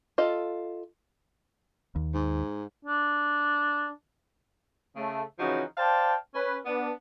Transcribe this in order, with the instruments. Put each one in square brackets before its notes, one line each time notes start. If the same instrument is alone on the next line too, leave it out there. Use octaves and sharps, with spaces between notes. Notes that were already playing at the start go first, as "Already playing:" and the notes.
[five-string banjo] F4 A4 D#5
[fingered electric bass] D#2
[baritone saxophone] G#2
[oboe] D4
[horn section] C#3 A3
C#3 E3 F3 C#4 D#4 F#4
C5 D5 F5 G5 A5
C#4 B4
B3 D4